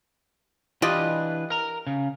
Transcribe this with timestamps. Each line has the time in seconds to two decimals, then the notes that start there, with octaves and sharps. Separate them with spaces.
0.82 E3 D4 F4 G4 B4 D#5
1.50 A#4 A#5
1.87 C#3